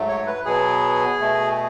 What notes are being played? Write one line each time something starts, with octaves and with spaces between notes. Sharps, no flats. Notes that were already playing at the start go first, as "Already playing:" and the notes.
Already playing: G#2 F#3 A3
C#5
B4
B2 F#3 B3 G#4
B2 A3